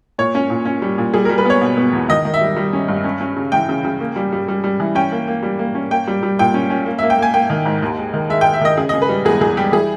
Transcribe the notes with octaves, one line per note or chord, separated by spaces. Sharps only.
A#2 C#5
C#4
A#2
C#4
G3
A#2
G3 G#4
G3 A#4
B4
B3 C#5
B2
B3
E2
D#3 D#5
D#3
E5
G3
G3
C#4
G2
C#4
C#4
C#3
E3 G5
C#3
C#3
A#3
G3
G3
G3
G3
E3
C#4 G5
A#3
A#3
G3
A#3
C#4
A#3 G5
G3
G3
A#2 G5
C#4
C#4
A#3
A#3 E5
G5
A#3 G#5
A#3 G5
D#3
G#2
D#2
G#3
D#3
G#3 E5
G#3 G5
E5
D#3 D#5
C#3 G#4
C#3 D#5
B4
G3
E2 G#4
E2 G#4
G3 G4
E3 G#4